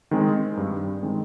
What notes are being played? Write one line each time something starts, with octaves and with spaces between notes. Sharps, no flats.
D#3 G#3 C4
G2
D#3 G#3 C4